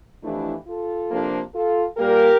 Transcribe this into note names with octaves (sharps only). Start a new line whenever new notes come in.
F2 E3 A3 D4 E4 G4
F4 A4
C3 F3 A#3 D4
F4 A4
A#2 G3 A#3 G4 A#4